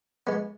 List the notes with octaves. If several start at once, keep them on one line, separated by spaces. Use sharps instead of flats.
G#3 B3